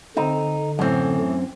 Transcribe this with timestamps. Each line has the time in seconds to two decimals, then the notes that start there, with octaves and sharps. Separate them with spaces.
0.17 D3 C4 D#4
0.79 F#2 A2 E3 C4